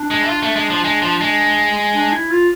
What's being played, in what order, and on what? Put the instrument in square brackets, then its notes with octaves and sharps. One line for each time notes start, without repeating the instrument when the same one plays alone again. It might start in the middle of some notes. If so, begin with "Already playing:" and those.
Already playing: [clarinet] D4
[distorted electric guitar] G#3
E4
F4
A3
G#3
F3
G#3
F3
G#3
[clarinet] D4
E4
F4